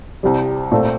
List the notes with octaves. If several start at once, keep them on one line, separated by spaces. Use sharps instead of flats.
C2 C3 G3
A#2 A3 C4